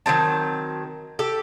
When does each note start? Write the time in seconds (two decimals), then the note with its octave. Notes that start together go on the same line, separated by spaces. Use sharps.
0.06 D#3 F#3 C4 A5
1.19 G4 A4